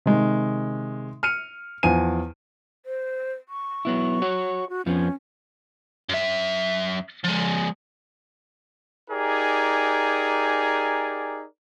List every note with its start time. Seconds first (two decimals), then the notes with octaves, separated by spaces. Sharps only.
0.06 C3 D#3 G#3
1.23 F6 C#7 D#7
1.83 E2 F3 C5 G#5 D#7
2.86 C5
3.49 C#6
3.85 F#3 B3 E4
4.22 F#4 C#5
4.70 F#4
4.86 F2 F3 B3 C#4
6.09 F#2 E5
7.24 F3 G#3
9.10 D#4 G4 G#4 A#4 D5 G#5